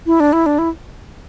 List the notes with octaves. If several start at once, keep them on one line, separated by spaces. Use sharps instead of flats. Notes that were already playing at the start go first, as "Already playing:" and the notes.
E4
D4
E4
D4
E4